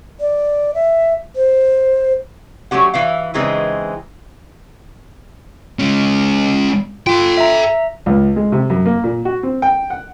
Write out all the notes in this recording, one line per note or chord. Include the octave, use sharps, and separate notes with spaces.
D5
E5
C5
F#3 A3 C#4 G4 F#5
E3 E4 F5
C#3 E3 G#3 C4 D#4
G#3 C#4
F4 A4 G5
E5 A#5
C#2
G#3
C3
F#2
A#3
A#2
F#4
C4
G5
F#5